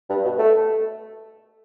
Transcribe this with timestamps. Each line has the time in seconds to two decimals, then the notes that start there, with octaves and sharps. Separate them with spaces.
0.10 G2
0.24 B2
0.38 A3